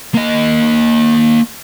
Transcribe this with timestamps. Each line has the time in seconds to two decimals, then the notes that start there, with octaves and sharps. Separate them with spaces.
0.15 A#3 D#5